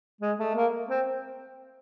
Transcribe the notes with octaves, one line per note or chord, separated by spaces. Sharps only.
G#3
A3
A#3
C4